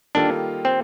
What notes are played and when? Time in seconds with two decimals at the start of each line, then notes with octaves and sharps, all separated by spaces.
0.15 D#3 G3 A#3 D4 F4 A4
0.65 C4